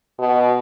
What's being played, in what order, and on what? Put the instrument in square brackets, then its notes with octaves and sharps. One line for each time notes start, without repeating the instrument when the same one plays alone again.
[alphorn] B2